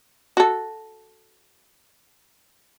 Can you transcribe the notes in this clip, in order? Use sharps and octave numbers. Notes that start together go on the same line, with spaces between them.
F#4 A4